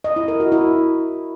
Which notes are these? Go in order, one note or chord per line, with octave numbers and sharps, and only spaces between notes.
D#5
E4
A#4
F#4
E4